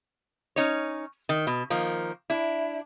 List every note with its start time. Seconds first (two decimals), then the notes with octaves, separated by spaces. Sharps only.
0.56 C#4 D#4 C#5
1.29 D#3
1.47 B2
1.70 D#3 F3 A#3
2.30 D4 E4